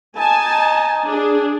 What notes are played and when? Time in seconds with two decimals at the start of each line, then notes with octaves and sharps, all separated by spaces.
0.17 D#4 G#5 A5
1.08 D4 G#4